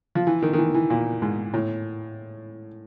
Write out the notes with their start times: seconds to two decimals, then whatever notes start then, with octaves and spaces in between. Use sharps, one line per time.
0.15 F3
0.27 E3
0.43 D#3
0.53 D#3
0.58 E3
0.74 E3
0.90 A#2
1.22 G#2
1.54 A2